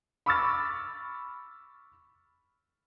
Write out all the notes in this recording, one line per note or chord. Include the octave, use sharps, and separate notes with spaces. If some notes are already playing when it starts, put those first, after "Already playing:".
B5 C#6 D6 E6 F6 A6